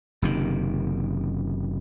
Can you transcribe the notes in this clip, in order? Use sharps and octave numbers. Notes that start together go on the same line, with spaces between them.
F#1 C3 D#3